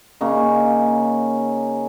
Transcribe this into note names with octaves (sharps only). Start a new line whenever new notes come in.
C#3 A#3 C#4 D#4